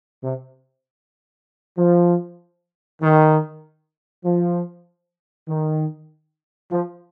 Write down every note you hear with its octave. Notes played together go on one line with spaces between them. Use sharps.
C3
F3
D#3
F3
D#3
F3